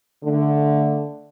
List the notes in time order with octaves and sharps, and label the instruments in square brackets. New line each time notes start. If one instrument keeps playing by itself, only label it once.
[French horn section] D3 A3